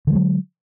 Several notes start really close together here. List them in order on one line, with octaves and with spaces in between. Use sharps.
D3 F3 G#3 F#3